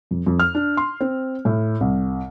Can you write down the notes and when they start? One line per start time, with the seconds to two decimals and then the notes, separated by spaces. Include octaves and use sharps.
0.11 F2
0.27 F2
0.40 F6
0.55 D4
0.77 C6
1.01 C4
1.45 A2
1.81 C2